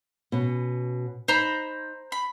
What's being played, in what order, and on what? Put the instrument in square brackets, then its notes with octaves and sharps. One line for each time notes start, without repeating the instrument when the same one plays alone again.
[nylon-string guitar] B2 C#4
[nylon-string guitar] D#4 [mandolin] C5 A#5 B5
[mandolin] B5